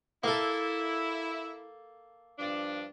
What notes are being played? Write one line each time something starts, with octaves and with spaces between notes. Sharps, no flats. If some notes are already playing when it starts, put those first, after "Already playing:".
A#3 E4 A4
G2 F3 D4